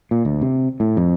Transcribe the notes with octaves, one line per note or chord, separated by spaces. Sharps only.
A#2
D2
C3
A2
F2